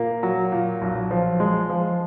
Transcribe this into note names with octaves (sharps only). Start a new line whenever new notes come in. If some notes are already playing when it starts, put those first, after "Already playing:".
Already playing: A#2 A#3
F#3
A#2
B1
F3
G#3
F3